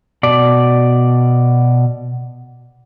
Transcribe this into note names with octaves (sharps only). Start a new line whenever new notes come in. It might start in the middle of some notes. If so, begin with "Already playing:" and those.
B2 D5